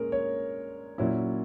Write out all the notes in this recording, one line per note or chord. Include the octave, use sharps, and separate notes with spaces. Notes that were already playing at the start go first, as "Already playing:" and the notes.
Already playing: A#2 G#3 C#4 A#4
C#5
A#2 F#3 C#4 E4